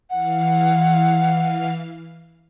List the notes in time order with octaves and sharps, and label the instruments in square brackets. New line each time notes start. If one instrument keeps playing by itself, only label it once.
[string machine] E3 F5 [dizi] F#5